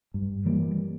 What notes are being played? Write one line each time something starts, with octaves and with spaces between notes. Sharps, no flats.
G2
E3 G3 A#3